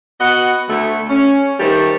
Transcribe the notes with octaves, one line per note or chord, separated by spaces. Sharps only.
B3 F#4 D#5 F#5
D2 A3
C#4
D#3 G3 A3 B3 G4 C5